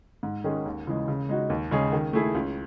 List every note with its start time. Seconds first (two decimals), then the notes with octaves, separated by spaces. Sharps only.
0.23 G#2
0.44 D#3 G#3 C#4 G#4
0.66 D#2
0.87 C#3 E3 G#3
1.08 C#3
1.29 G#3 D#4 F#4
1.50 D#2
1.71 C#3 G#3 C#4 G#4
1.93 D#3
2.13 A3 E4 G#4
2.35 C#2